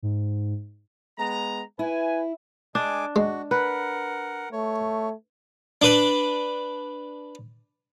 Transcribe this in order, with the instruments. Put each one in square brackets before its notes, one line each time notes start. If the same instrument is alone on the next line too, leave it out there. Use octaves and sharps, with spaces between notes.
[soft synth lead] G#2
[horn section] G#3 B3 A#5
[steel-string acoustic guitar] E4 [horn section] B4 G#5
[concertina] G#3 G#5 D6 [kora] D4
[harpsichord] G#3 [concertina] F#4
[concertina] A#4 F#5 [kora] B4
[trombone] A3 [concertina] C#5
[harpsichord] D4 B4